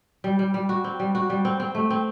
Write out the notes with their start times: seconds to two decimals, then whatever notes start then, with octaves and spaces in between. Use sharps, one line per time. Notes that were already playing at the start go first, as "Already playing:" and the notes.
0.24 G3
0.39 G3
0.54 G3
0.69 F#4
0.84 C4
1.00 G3
1.15 F#4
1.30 G3
1.45 C4
1.60 C4
1.75 A3
1.90 C4